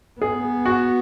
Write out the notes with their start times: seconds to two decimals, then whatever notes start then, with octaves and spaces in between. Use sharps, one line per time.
0.21 B3 G#4
0.65 F#4